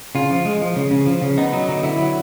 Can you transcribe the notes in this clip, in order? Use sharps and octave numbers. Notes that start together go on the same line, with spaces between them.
C#3 F4
F3
G#3
F3
C#3
C#3
F3
C#3
B3 D#4
F#3 D#4
D3 D#4
D3 E4
F#3